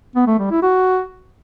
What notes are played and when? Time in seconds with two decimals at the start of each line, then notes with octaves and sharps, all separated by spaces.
0.16 B3
0.27 A3
0.39 G3
0.51 E4
0.63 F#4